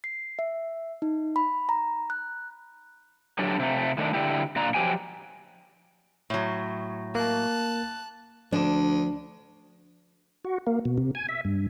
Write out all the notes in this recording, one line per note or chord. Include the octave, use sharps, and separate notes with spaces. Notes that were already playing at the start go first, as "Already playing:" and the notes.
C7
E5
D#4
B5
A#5
F#6
F#3 D4 G4 A4
C3 A3
D#3 A3 D4
D3 E4 G4
A#2 D4 F4 A#5
F3 F#3 G4 G5 G#5
A2 F#3
A#3 A5 F#6
D2 F3 D4
F#4
A#3
B2
C3
G#5
E5
G2